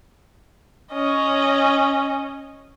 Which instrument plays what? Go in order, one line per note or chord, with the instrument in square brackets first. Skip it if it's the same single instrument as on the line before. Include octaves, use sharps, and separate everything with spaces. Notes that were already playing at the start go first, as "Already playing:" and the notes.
[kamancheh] C#4 D#5